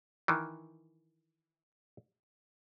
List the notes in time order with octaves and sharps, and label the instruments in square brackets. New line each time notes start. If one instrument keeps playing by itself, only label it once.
[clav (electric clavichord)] D#3 E3